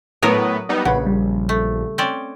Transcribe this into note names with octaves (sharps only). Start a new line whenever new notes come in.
A2 F#3 B3 A#4 C#5 D#6
G3 B3 D#4
A#1 C#3 B4 F#5
G3
A3
C4 C#4 D5